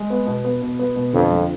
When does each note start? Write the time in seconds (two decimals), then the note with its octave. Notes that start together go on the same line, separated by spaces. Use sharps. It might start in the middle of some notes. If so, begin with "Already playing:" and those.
Already playing: G#3
0.10 B3
0.27 B2
0.45 B3
0.62 B2
0.79 B3
0.96 B2
1.13 F2 D3
1.31 F3